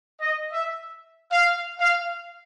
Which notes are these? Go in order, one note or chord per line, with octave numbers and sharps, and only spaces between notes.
D#5
E5
F5
F5